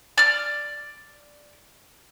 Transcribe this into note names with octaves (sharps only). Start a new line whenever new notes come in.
D5 F6